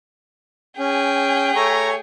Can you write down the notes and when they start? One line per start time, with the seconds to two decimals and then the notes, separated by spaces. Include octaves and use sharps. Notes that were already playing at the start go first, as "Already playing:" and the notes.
0.79 C#4 G#4 G5
1.56 A3 C#5 G#5 A#5